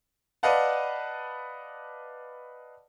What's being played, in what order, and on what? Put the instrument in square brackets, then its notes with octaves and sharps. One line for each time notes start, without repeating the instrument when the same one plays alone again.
[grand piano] B4 D5 D#5 F5 F#5 A5